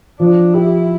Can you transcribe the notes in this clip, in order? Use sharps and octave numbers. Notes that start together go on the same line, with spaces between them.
F3 D4
E4 G4